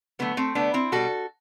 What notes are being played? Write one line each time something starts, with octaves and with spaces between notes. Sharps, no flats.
D3 F#3 A3 B3
A3 C4
D3 A3 B3 D4
C4 E4
B2 G3 F#4 A4